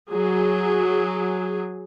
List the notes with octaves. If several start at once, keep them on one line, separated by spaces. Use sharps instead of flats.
F#3 G#4